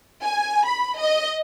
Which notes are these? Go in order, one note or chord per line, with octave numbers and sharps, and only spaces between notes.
G#5
B5
D#5